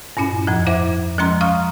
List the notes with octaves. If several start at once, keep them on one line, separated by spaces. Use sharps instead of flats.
G2 A#2 C#4 E4
F2 A2 F3
E4 C5 E5 F#5 D6
F3 G#3 C#4 A#5 C6
F5 A#5 C#6 D#6 F6